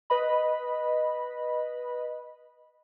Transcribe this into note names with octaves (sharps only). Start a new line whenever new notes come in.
B4 D#5 B5